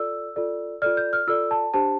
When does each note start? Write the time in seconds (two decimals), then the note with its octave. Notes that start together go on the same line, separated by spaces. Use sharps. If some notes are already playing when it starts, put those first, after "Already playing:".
Already playing: F4 A4 D5 E6
0.36 F4 A4 D5
0.82 F4 A4 D5 F6
0.97 G6
1.13 F6
1.27 F4 A4 D5 E6
1.51 A5
1.74 D4 G4 C5 A5